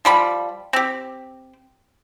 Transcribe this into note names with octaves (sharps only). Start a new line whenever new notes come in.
F3 G3 B5
C4 G4